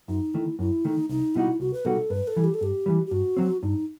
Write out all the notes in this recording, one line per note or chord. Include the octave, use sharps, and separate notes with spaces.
F#2 D#4
D#3 A3 E4
F#2 E4
D#3 A3 D#4
C2 D#4
B2 G3 D#4 E4 F#4
C2 F#4
B4
B2 G3 D#4 F#4 A4
G2 B4
A4
E3 G3
G4
A4
G2 G4
E3 G3
G4
G2 F#4
F#3 C4
G2 D#4